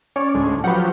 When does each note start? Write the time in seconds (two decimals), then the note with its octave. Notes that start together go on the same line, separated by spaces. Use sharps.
0.16 C#4 C#5 D5
0.34 D2 A2 G#3
0.64 F3 F#3 G4 B4 F#5